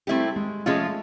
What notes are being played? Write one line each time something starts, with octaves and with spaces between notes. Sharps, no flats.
G3 A3 C4 E4 G4
G#3
F3 G#3 A3 C#4 F4